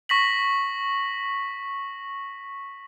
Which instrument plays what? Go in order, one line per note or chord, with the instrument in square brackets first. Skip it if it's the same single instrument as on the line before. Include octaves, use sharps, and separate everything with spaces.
[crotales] C#6 A#6 B6 F#7